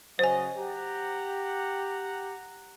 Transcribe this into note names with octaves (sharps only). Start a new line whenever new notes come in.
C#3 F#3 C5 D#5 G#5
G4 F#5 A#5